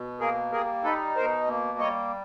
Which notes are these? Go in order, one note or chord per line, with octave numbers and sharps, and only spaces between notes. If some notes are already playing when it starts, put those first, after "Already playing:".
Already playing: B2
A#3 G#4 A#4
G3 G#4 A#4
D#4 A4 B4
B2 A#4 C5
A#3
G3 C#5 D#5